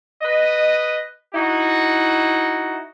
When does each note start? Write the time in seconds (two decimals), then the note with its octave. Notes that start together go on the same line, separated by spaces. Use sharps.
0.22 B4 D#5
1.35 D#4 E4 F#4